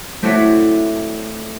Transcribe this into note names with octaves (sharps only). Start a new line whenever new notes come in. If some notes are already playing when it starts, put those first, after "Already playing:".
A3 C4 D4 E4 F#4 C#5